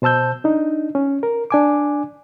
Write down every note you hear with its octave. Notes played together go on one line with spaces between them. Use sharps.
B2 C5 A5 E6 G6
D4 D#4
C#4
A#4
D4 G#5 D6